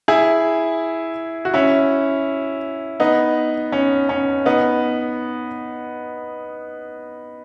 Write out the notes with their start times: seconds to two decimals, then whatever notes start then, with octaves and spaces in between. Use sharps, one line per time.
0.08 E4 G#4
1.45 F#4
1.54 C#4 E4
3.00 B3 D#4
3.72 C#4
4.09 C#4
4.45 B3 D#4